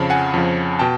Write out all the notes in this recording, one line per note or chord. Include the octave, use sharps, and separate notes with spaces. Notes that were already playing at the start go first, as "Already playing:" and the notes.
Already playing: F2 C#3 F3 A5 B5
F#5 G#5
F2 C#3 F3
B2 G5 A5